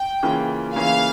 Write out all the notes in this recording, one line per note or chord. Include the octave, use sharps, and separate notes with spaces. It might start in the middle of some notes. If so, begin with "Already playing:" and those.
Already playing: G5
C#3 E3 A#3 C#4 F4
C#3 E3 A#3 C#4 F4 F5